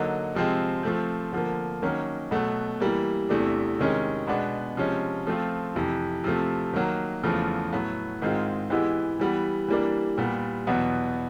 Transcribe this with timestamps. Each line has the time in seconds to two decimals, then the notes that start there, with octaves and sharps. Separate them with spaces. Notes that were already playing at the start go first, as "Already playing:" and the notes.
Already playing: D3 F#3 A#3 D#4
0.35 C3 F3 G#3 C4
0.83 F3 A3 C4
1.32 D3 F3 A#3
1.82 D#3 F#3 A#3 C#4
2.31 B2 F#3 A3
2.80 E3 G3 A#3
3.29 E2 C3 E3 A3 D4
3.79 C3 D#3 G#3 C#4
4.27 B2 G#3 B3 D4
4.77 C3 F3 G#3 C#4
5.27 F3 A3 C4 F4
5.75 F2 C3 E3
6.24 C3 F3 A3
6.73 D#3 F#3 A#3
7.23 E2 C#3 F3 A3
7.73 A2 F#3 B3
8.22 G#2 D#3 G#3 C4 F4
8.70 E3 G#3 B3 E4 G4
9.19 E3 G3 B3
9.68 E3 G3 A#3 D4
10.18 A#2 G3 B3
10.67 E2 B2 F#3 B3